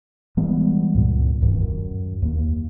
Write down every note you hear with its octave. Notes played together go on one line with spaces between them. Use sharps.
E3 G3 G#3 B3
C#2 G2 A#2
D1 B1 G2 D#3
F#2
D#2 A#3